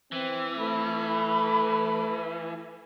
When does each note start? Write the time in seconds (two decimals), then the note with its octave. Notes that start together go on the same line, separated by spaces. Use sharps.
0.12 E3 C4
0.59 A3 B5